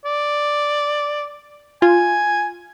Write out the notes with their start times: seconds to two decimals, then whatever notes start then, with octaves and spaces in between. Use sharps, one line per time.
0.05 D5
1.82 F4 G#5